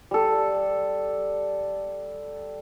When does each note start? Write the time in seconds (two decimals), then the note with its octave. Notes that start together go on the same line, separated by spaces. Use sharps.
0.11 G3 A4